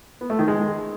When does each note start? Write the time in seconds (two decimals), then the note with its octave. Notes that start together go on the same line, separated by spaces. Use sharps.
0.21 B3
0.30 A3
0.39 D#3
0.48 G#3